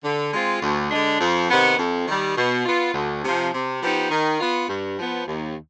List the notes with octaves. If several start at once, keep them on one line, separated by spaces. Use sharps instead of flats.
D3
G#3 C4 F4
D2
D3 G#3 D4
F2
C3 D#3 B3
F2
D#3 G3
B2
B3 F4
D2
C3 F3
C3
F3 B3 D#4 G4
D#3
B3 F4
G2
F3 B3
D#2